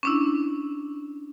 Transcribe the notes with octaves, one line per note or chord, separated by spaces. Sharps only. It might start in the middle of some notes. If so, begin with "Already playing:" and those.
C#4 D4 E4